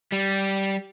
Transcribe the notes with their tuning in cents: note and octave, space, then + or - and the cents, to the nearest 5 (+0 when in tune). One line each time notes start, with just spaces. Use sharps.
G3 -10